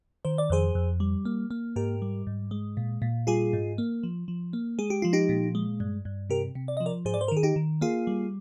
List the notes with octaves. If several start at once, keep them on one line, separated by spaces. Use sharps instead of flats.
D#3 C5
D5
F2 G#4 C5
F2
G3
A#3
A#3
G#2 G4 A#4
G3
G#2
G#3
A#2
A#2
G3 F4 G#4
G#2
A#3
F3
F3
A#3
G#3 G#4
G4
F3 F4
D#4 G4
A#2
G#3
G2
G2
C3 G4 A#4
C3
D5
F3 D#5
A#4 D5
G#2 G#4 C5
D5
C5
A#4
D#3
G#4
D#4 G4
D#3
A#3 F4 G#4
G3